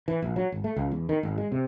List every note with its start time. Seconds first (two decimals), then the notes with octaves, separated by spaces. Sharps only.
0.08 E3
0.22 A#1
0.36 F#3
0.52 G#1
0.64 A3
0.76 C#2
0.92 E2
1.09 D#3
1.23 G#1
1.38 G#3
1.52 C3